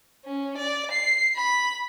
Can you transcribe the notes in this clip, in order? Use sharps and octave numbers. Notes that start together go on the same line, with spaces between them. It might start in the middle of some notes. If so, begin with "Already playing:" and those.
C#4
D5
C7
B5